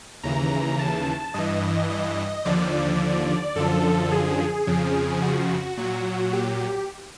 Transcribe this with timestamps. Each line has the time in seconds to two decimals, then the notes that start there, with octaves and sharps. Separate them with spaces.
0.23 D#2 C#3 E3 A#5
0.79 A5
1.34 G2 E3 D#5
1.90 D#5
2.45 D#2 D3 F3 D5
3.56 F#2 D3 F3 A4
4.11 G#4
4.67 F2 C#3 F3
5.22 F#4
5.77 A#2 F#3
6.33 G4